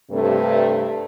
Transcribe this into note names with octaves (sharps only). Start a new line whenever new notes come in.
G2 C3 A3